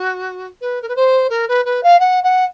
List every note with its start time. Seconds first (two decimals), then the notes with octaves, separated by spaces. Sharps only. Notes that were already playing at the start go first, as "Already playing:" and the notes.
Already playing: F#4
0.61 B4
0.82 A#4
0.88 B4
0.95 C5
1.29 A#4
1.48 B4
1.65 B4
1.83 F5
1.99 F#5
2.23 F#5